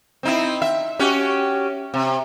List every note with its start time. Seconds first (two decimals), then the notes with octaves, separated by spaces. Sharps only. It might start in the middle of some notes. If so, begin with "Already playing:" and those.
0.23 C4 D#4 E4
0.62 E5
0.99 C#4 F#4 G4
1.94 C3